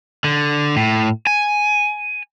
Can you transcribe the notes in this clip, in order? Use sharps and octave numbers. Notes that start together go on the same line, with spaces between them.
D3
A2
G#5